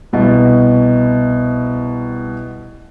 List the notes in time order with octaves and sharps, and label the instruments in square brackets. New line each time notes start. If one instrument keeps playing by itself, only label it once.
[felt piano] C2 B2